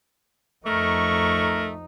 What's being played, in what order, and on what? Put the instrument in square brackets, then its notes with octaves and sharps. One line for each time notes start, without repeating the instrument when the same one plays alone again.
[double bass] F2 D#4 [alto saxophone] A3 [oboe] A#4 [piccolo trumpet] C#6